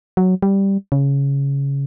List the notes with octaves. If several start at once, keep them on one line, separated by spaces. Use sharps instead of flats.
F#3
G3
C#3